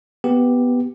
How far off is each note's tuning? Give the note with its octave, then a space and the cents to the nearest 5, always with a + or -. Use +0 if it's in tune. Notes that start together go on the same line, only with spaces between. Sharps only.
B3 +0 G4 +0